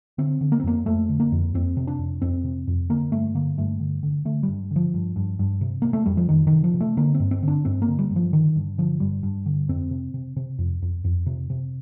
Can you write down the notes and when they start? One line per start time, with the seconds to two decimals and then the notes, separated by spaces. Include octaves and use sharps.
0.18 D3 C4
0.41 D3
0.52 A#3
0.60 C4
0.64 F2 A#3
0.86 F2 A3
1.09 D3
1.20 A#3
1.32 F2
1.54 F2 C4
1.77 C3
1.87 D4
1.99 F2
2.22 F2 C4
2.44 C3
2.67 F2
2.89 D3 A#3
3.12 G2 A3
3.35 D3 A#3
3.58 G2 A3
3.80 D3
4.03 D3
4.25 D3 A3
4.43 G2 G3
4.71 D3
4.76 F3
4.94 G2
5.16 G2
5.39 G2
5.61 C3
5.82 C3 A#3
5.93 A3
6.06 F2 G3
6.17 F3
6.29 F2 D#3
6.47 D#3
6.52 C3
6.64 F3
6.74 C3
6.80 A3
6.97 D3 A#3
7.15 C4
7.20 G2
7.31 C4
7.43 D3 D4
7.65 G2 C4
7.82 A#3
7.88 D3
7.99 G3
8.10 G2
8.16 F3
8.33 D3 D#3
8.56 G2
8.78 D3 F3
9.00 G2 G3
9.23 G2
9.46 D3
9.69 F2 C4
9.91 C3
10.14 C3
10.36 C3
10.59 F2
10.82 F2
11.04 F2
11.26 C3
11.50 C3